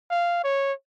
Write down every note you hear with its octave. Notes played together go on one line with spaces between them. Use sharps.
F5
C#5